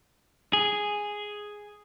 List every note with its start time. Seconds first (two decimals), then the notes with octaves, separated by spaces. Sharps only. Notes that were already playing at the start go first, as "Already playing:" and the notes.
0.53 G#4